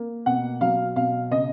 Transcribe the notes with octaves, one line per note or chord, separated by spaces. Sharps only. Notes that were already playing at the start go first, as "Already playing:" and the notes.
Already playing: A#3
B2 F#5
F#3 F5
B2 F5
C#3 D#5